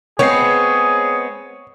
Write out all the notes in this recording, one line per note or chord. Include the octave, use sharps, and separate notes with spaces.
G#3 B3 C4 G#4 C#5 C7